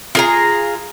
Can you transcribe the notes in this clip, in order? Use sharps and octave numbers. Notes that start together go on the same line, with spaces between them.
F4 G#4 A#5